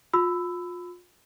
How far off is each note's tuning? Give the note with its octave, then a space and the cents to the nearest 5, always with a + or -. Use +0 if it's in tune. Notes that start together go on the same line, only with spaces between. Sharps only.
F4 +30 B5 +25 E6 +0